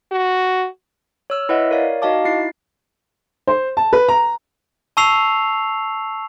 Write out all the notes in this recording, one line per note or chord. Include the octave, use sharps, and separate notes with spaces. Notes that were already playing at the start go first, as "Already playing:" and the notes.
F#4
C#5 E6 F6
E4 B4 C#5 D#5 E5 F#5
A#4 C#5 D5 F5
D#4 F#4 D#5 F5 A5 D6
D#4 E4 A6 C7
C5
A5
B4
A#5
A5 C#6 E6 C7 F7